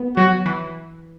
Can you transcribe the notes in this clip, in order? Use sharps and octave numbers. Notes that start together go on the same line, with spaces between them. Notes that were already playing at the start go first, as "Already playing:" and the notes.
Already playing: B3
F#3 F#4
E3